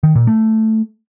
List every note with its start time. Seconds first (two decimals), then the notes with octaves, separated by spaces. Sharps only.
0.03 D#3
0.15 A#2
0.27 A3